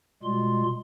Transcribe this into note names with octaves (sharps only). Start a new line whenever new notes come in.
B2 G3 G#3 F4 C6